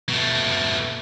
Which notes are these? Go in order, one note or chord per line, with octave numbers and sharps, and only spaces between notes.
B2 A3